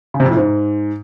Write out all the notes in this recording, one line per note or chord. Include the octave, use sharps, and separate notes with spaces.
C#3
C3
F2
A2
G#2